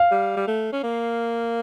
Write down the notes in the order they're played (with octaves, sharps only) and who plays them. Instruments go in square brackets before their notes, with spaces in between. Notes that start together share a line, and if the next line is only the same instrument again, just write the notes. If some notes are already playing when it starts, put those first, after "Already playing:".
Already playing: [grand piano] F5
[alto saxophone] G3
G3
A3
C#4
A#3